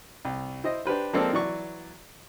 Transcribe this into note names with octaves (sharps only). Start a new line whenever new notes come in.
C2
E4 C5 D#5
D4 G4 B4 C5
F3 G#3 A#3 C4 A4 D5
E3 F#3 D5 C#6